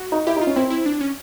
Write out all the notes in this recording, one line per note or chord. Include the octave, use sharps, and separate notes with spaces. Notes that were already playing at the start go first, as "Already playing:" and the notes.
Already playing: F#4
D#4
E4 G4
D#4
F4
C#4
C4 E4
E4
D4
C#4